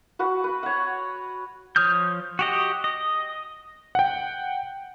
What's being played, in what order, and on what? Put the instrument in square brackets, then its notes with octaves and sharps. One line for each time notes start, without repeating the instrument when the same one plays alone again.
[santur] F#4 B4 F#5
B4
C#5 F#5
[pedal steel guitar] F3 C#5 D#6 F6 G6
F#4 G4 D#5
D#5
[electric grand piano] F#5 G5